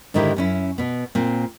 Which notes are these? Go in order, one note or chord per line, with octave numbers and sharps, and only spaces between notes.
G#2 D3 D#3 G#3 E4 G4
F#2 C#4 E4
B2 B3
A#2 C4